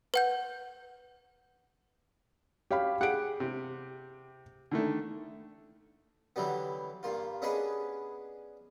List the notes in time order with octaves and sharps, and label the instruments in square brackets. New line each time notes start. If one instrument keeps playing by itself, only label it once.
[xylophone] B4 F#5 G6
[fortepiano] C#4 [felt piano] G4 F5 B5
[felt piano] G4 D7 [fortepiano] G#4 F#5
[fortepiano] C3
D3 D#3 A3
[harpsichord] D3 E3 F#3 G3 B3
G2 A#3 F4
B3 C#4 D4 G#4 B4 D#5